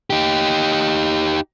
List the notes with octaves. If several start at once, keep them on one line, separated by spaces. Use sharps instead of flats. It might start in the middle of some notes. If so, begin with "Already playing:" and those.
D#4 G4